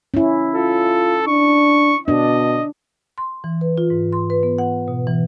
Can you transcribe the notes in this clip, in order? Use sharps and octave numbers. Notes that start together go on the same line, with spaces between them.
C#4 E4
F4 A4
D4 C#6
B2 D4 D#5
C6
E3
B4
F4
G#2
C6
B4
B3
F#5
B2
E3